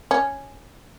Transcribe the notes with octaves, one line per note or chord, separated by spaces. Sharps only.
C#4